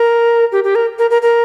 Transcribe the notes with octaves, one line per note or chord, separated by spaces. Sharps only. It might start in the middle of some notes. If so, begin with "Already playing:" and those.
Already playing: A#4
G4
G4
A#4
A#4
A#4
A#4